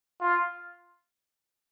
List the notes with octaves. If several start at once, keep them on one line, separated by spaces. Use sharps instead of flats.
F4